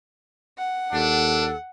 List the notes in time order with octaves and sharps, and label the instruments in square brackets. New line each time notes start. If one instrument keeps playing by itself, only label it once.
[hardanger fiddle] F#5
[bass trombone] D#2 [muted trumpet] D4 [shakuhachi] A4